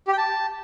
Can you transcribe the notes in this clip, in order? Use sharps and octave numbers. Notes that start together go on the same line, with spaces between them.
G4
G5
A5